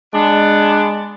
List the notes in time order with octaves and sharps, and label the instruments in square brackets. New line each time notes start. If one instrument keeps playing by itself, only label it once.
[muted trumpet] G#3 [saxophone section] B3 D4